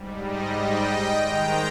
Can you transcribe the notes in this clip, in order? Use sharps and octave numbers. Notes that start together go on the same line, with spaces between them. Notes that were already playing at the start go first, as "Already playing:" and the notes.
Already playing: G#2 G3
D#5
D#5 G5
G#2 D#3 G#3 G5 A#5